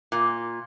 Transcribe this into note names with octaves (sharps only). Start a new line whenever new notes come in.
A#2